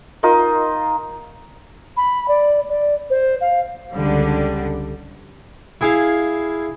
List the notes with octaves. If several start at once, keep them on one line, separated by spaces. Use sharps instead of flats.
D#4 F4 A#4 D#5
B5
D5
D5
C5
F5
C#2 D3 G3
E4 G#4 F5